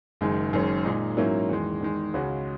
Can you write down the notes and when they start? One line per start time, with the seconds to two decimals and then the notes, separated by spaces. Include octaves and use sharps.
0.21 F#1 F#2 D#3 G#3
0.53 F#1 F#2 D#3 G#3 C#4
0.85 A#2 G#3 D#4
1.17 G#2 F#3 A#3 C#4 E4
1.49 E2 D#3 G#3
1.81 E2 D#3 G#3
2.13 C#2 C#3 G#3 C#4 F#4